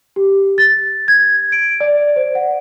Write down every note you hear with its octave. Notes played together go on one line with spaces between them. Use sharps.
G4
A6
G#6
D7
D5
C5
F#5